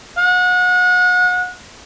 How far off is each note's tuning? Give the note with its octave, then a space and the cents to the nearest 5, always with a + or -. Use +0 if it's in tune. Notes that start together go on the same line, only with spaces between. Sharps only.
F#5 -35